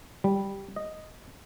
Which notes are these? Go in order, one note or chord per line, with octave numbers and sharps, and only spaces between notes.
G3
D#5